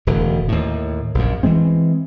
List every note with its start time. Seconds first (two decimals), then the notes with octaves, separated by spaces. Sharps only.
0.07 E1 A2 D3
0.48 D#2 A2
1.15 A#1 F#2
1.43 E3 F#3 G#3 C4